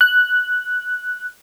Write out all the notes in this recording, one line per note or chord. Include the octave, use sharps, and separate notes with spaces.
F#6